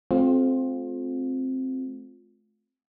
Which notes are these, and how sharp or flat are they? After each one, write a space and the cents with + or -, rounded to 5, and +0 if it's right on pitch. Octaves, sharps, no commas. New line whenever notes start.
A3 -40 C4 +0 F4 +20